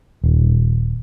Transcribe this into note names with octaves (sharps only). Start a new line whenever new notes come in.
D#1